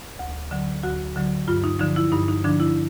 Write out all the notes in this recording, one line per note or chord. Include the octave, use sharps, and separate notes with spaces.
D2
D3 F#3
D2 F#4
D3 F#3
G2 F4
D#4
D3 F3 D#4
E4
G2 D#4
D#4
D3 F3 D4
E4